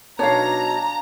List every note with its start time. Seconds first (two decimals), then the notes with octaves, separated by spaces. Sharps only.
0.19 B2 F#3 D4 D#4 C#5 F5 A#5